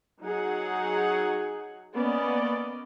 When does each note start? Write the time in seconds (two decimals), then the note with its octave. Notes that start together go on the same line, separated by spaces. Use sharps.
0.21 F#3 D#4 G#4 F#5
1.93 A#3 B3 C#4 D5 D#5